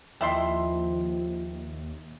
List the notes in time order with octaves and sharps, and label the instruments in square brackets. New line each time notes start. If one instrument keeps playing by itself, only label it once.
[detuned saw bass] D#2 [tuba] F3 [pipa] A3 E4 C6 [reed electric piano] D#5 E5 G5